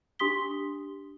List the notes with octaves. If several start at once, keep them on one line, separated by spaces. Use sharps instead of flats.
D4 G4 C6 D#6 B6 G7